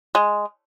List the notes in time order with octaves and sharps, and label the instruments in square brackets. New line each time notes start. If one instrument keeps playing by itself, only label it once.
[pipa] G#3